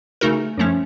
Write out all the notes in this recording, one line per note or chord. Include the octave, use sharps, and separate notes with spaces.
C#3 A3 D#4 F#4 A#4
F#2 F3 A3 C#4